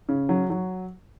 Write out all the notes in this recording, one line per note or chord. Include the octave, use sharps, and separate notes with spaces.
C#3
F#3
F#3